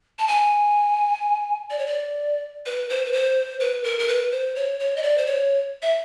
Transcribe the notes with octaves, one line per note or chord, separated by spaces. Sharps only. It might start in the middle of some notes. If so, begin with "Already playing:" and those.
A5
G#5
D5
C#5
D5
B4
C5
B4
C5
B4
A#4
A#4
B4
C5
C#5
C#5
D#5
D5
C5
C#5
E5